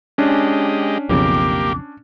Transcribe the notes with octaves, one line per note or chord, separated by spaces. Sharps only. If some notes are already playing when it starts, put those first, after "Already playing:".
G#3 C#4 D4 G4 D#5
B1 F2 C#3 A#3 G4 D6